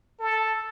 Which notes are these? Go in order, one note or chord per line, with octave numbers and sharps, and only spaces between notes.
A4